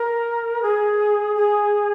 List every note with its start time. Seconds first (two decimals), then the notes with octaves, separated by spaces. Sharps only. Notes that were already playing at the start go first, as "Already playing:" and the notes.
Already playing: A#4
0.62 G#4
1.36 G#4